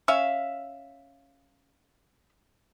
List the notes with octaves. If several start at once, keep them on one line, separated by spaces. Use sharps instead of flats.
C#4 E5 F5